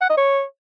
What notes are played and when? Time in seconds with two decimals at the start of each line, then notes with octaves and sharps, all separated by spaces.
0.02 F#5
0.10 D#5
0.18 C#5